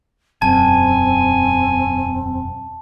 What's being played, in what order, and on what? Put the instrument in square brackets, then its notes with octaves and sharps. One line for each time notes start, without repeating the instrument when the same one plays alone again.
[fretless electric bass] E1 F#2 [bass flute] C4 [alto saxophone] G#5 [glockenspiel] A5